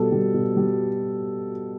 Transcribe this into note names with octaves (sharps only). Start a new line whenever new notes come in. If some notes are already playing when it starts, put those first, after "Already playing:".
Already playing: B2 G3 A4
G3
B2
G3